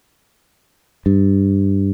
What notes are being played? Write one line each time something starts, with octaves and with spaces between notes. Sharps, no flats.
G2